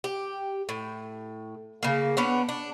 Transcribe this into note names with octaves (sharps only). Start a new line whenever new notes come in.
G4
A2
C#3 A#3
B3 C#4 D4
D4